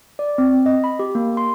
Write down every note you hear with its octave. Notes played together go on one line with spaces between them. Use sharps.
D5
C4
D#5
B5
G4
A#3
C6